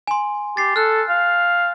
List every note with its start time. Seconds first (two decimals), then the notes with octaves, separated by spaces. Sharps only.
0.07 G#5 C6
0.57 G4 A6 C7
0.76 A4 F6 F#6
1.09 F5